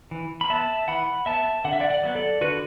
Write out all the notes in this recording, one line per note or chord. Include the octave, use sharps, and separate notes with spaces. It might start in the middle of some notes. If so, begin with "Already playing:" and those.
E3
B5
B3 E5 A5
E3 F#5 B5
B3 E5 A5
D3 F#5
E5
D5 F#5
D5 F#5
F#3 B3
A4 D5
D3 F#4 B4